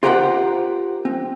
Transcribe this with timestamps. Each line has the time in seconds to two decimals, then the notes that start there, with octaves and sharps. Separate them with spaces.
0.03 F4 G4 A#4 C5 F#5 G5
1.05 C4